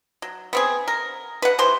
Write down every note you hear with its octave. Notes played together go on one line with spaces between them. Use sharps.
F#3
B3 C4 G#4
A#4
B4 F#5
C3 E3 C5 C6